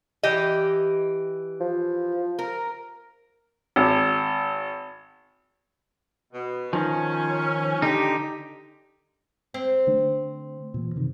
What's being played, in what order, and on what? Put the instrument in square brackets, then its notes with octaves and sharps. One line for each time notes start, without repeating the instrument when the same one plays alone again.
[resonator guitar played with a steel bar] E3 G4 D#5
[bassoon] F3
[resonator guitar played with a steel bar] A#4
[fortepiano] G#1
[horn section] B2
[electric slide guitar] D#3 F3 [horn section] C#4
[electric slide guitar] D3 D#4 [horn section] G4
[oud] C4
[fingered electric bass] D3 A3 D4
A#2 E3
F#2 C3 D#3